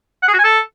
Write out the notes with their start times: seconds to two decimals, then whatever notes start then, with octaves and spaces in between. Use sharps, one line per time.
0.23 F#5
0.28 G#4
0.34 F#4
0.39 G#5
0.44 A4